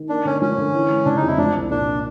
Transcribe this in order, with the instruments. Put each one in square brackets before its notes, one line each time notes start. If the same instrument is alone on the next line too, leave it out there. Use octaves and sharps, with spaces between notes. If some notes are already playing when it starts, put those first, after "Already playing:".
Already playing: [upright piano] D#3
[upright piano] A#3 [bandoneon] D4
[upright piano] D3 [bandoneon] C#4
[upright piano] F3 [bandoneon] C#4
[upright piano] D3
E3
G#3
[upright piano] C#3 [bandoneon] D4
[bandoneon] D#4
[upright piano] F2 [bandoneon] E4
[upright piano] F3 [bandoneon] D4
[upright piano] C2
[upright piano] A#2 [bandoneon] D4